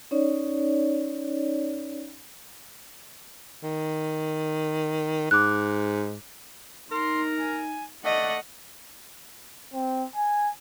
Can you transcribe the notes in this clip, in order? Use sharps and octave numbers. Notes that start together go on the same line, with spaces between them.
C#4 D#4 C#5 D5
D#3
G#2 D6 F#6
D#4 A#4 C6
G#5
A3 D5 D#5 F#5
C4
G#5